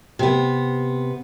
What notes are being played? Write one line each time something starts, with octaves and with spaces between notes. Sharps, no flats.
C3 B3